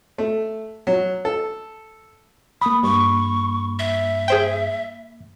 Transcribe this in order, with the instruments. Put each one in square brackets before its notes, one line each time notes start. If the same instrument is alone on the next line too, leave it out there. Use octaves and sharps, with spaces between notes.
[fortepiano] A3
F#3
A4
[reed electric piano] A#3 B5 [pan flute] D#6
[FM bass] G2 [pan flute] C#6
[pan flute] E5
[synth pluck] G#4 C5 G5